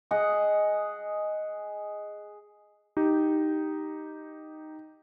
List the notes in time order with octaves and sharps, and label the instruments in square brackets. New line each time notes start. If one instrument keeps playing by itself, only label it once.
[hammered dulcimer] G#4 D#5 F#5
[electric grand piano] D#4 G4